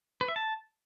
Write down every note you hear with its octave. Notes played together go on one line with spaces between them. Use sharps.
B4
E5
A5